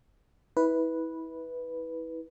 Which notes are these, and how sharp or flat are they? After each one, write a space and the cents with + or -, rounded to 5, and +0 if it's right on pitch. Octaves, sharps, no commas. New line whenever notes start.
E4 -30 B4 -5